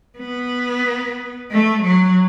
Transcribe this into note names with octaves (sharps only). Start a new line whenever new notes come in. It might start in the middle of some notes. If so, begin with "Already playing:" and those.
B3
A3
F#3